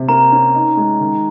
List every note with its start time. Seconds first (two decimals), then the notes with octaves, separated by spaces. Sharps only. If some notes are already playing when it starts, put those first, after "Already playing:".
Already playing: C3
0.08 A#3 A#5
0.32 C#4
0.55 D#4
0.77 G#3
1.01 D#3